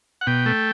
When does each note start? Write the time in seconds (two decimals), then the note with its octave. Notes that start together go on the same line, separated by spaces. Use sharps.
0.21 F#5
0.27 B2 G5
0.46 A3